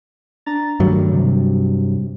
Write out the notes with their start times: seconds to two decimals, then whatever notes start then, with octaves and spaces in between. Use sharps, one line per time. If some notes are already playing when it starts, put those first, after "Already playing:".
0.46 D4 A#5 A6
0.80 G2 D#3 F#3 G3 A3
1.12 C3